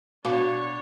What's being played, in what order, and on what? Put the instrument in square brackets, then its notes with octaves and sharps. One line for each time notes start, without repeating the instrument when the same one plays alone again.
[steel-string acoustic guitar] B2 [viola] D4 C#5 [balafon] F#4 F5 D6